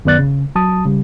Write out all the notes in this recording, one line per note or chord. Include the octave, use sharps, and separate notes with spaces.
F#2 D#3 B3 D5 F#6 A6
C#3
F#3 A5 D#6
C#3 G3